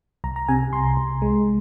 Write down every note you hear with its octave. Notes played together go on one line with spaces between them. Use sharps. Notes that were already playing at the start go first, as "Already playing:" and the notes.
C2 A#5
A#5
C3 G#5
C2 C6
C2
G#3